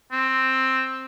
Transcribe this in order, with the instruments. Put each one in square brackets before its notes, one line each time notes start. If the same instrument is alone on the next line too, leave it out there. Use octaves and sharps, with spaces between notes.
[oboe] C4